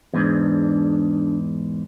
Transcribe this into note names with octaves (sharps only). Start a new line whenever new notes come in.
E2 G#2 D4